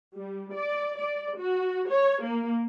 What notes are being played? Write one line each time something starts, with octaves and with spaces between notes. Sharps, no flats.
G3
D5
D5
F#4
C#5
A#3